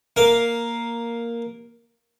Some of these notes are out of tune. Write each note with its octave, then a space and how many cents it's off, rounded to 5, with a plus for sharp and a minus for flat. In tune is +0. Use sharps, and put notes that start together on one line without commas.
A#3 +0 F5 +0